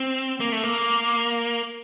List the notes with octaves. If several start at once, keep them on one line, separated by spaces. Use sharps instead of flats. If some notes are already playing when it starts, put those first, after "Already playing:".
Already playing: C4
A#3
A3
A#3